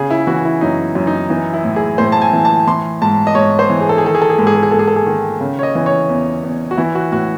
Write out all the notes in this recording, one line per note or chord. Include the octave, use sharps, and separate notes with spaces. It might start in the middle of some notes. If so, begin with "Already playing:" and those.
Already playing: C#3 G#4
E4
E3 F#4
E4
F#2 D#4
F#2
D#4
E3 D#4
E4
A2
G#4
A2 C5
A5
G#5
E3
A5
E3 C6
G#2 A5
D#5
G#2 C#5
C5
E3
G#4
A4
G#4
D#3 A4
G#4
A4
G#4
G#2 A4
G#4
A4
G#4
G#2 A4
G#4
A4
G#4
D#3
C#3
C#5
D#5
E3
C#5
E2
E2
F#4
E3 E4
F#4
A2 F#4